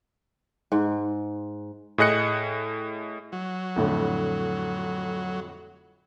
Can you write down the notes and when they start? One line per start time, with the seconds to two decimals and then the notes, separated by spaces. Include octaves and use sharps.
0.72 G#2
1.98 A2 G#4 D#5 F#6 C#7
3.32 F#3
3.76 F2 A2 D3